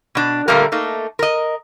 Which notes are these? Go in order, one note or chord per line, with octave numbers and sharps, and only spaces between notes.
B2 D4
A#2 D3 G3 A3 A#3 A#4
A3 A#3 D#4
A#4 D#5